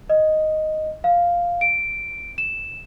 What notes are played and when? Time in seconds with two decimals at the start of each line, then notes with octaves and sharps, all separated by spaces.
0.10 D#5
1.04 F5
1.61 D7
2.38 E7